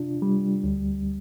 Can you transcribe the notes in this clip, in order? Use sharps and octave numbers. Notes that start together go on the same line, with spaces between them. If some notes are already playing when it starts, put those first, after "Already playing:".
Already playing: C3 D4 F4
G3
D2